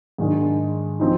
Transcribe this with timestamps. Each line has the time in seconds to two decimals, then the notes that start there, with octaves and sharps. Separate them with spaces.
0.18 G#2 D#3 G#3 D4
1.00 F3 C4 D#4